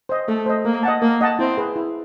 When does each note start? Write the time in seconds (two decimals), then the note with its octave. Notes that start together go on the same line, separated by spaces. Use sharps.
0.09 C5 D#5
0.28 A3 A4
0.46 C5 D#5
0.65 A#3 A#4
0.83 D#5 F#5 A5
1.01 A#3 A#4
1.21 D#5 F#5 A5
1.39 C4 E4
1.58 G#4 B4
1.76 E4